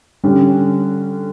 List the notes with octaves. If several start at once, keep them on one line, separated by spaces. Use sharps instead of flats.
D3 G3 C#4